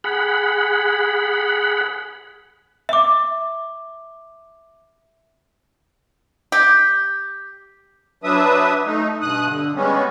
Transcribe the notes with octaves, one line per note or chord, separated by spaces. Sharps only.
G#4 F#5 B5
E5 D6
G4
F#3 D4 B4 E5 D#6
A3 D#4
G2 B2 D#6 F#6
D3
G3 G#3 B3 C#4